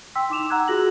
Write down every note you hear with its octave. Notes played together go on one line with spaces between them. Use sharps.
G5 C6 E6 B6
D#4 D6 E7 F7
F#5 A#5 E6 F#6 G#6
F4 F#4 G#4 A#6 F#7